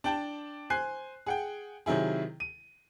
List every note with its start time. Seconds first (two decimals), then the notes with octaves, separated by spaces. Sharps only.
0.04 D4 G5 A5
0.70 C5 G#5 F#6 C7
1.26 G#4 F#5 G5
1.86 C3 D#3 F#3 E4 G#4
2.40 D#7